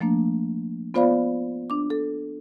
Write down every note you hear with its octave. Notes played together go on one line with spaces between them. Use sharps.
F3 A3 A#3 D4
B3 F4 C5 D5 F5 B5
D4 D6
A4